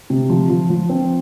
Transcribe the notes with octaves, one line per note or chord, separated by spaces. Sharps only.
C3
F3
F3
F3
C4